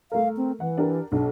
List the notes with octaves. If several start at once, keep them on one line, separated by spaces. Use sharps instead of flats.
A3 A#4 F5
C4
E3 F#5
D4 G4 A#4
B1 D4